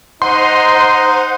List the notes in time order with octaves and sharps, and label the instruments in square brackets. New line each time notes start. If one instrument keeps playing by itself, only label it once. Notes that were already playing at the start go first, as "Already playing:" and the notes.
[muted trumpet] D#4 [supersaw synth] C5 F#5 D#7 [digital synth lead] C6